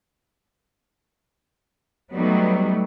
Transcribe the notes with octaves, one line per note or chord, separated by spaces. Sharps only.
F#3 G3 A3 B3 D#4